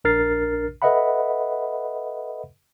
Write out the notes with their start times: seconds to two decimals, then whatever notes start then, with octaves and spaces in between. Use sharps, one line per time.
0.04 A#1 D4 A#4 F6 A6 C7
0.82 A4 B4 D#5 E5 F#5 B5